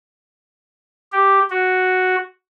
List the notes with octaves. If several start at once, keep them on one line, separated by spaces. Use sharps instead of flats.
G4
F#4